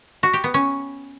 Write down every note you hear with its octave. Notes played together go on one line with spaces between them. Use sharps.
F#4
G4
B3
C#4